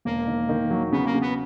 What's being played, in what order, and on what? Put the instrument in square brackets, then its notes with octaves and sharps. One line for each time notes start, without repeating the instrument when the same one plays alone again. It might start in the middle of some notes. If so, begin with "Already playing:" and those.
[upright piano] E1 [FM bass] A#3
[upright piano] D#3
D#3
F#3
[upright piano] C#3 [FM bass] B3
[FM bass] A#3
[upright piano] C#3
[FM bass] B3